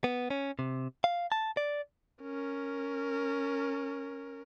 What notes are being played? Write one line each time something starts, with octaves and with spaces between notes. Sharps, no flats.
B3
C#4
C3
F5
A5
D5
C#4 A#4